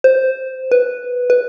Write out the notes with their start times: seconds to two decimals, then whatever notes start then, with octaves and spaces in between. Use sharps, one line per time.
0.04 C5
0.71 B4
1.30 B4